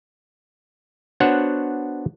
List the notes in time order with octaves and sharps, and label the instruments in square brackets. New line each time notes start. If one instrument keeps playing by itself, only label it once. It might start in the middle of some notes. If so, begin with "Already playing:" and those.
[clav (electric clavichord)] B3 D4 F#4 C5 C#5 F#5